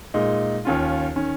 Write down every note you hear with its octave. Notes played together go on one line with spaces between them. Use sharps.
A#2 G#3 D#4
D#2 D#3 C#4 F4
D#3 C#4